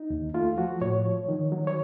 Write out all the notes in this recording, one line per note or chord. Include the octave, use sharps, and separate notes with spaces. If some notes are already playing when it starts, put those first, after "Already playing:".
Already playing: D#4
D#2
A3 F4
F3 F#4
A2 C#5
F3
D#3
F#3
C#5